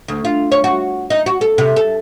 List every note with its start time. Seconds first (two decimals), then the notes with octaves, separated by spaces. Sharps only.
0.08 D2
0.25 F4
0.52 C#5
0.64 F#4
1.10 D#4
1.26 F#4
1.41 A4
1.58 C3
1.76 A4